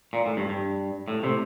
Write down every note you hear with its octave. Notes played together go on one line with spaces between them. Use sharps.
A#2
A2
G2
G2
A2
A2 C3